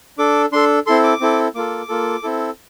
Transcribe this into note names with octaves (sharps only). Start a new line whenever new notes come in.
D4 A4 D6
D4 A4 C6
C4 E4 A4 C6
D6
C4 E4 A4
A#3 F4 A4 D6
A#3 F4 A4
C4 E4 A4